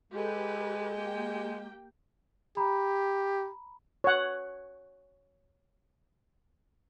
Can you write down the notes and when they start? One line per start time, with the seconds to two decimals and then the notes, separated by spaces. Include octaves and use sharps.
0.12 G#3 G4 A4 B4
0.95 A#3 G4 G5
2.57 G4 A#5 B5
4.04 C#5 F#5